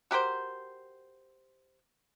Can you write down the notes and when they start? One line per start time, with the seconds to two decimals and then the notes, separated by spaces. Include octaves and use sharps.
0.11 F#4 G4 A#4 C5